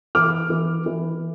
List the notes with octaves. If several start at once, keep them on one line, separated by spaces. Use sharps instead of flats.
E3 D6 F6
E3
E3